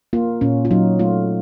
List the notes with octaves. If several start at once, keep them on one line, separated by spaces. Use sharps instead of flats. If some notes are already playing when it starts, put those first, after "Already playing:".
A#3 F4
A#2 C#4
F4
F#3 D#4
A3 F4